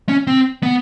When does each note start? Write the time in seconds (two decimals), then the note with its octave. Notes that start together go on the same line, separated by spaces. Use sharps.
0.09 C#4
0.27 C4
0.63 B3